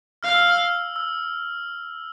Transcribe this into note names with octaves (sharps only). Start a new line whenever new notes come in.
F5 F6
E6
F6
E6